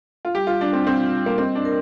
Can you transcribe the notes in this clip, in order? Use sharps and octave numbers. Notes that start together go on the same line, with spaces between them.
F4
G3 G4
F4
G3 D4
C4
C4 F4
G3
A#3
C4 D#5
D4
A#4